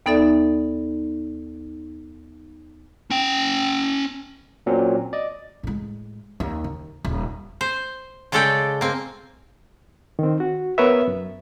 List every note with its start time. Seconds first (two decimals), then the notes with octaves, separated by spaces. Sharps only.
0.06 D#2 B3 D#4 A4 D5 E5
3.10 C#4 G5
4.66 A#2 F#3 C4 C#4
5.13 D5 D#5
5.63 A2 G#3
6.40 D#2
6.64 D#3
7.05 D#1
7.61 C5
8.32 C#3 G#3 C#4 A4 D5 G5
8.81 A#3 C4
10.19 D#3 C4
10.40 F#4
10.78 B3 A#4 B4 C#5 E5
11.08 F#2